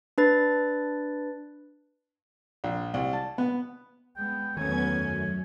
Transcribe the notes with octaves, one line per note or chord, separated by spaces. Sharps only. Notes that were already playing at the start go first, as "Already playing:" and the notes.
D4 B4 A6
A#1
C2
A5
B3
G#3 B3 G5
E2 D#3 F#3 A3 B3 C#4 G#5 G#6
F#2